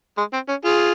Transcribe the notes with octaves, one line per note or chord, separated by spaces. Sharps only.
G#3
C4
C#4
F4 G#4